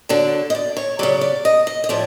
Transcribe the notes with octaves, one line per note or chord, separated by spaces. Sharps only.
D3 F#3 D5
D#5
D5
C#5
C#3 F#3 D5
D5
D#5
D#5
D#5
A2 F3 D5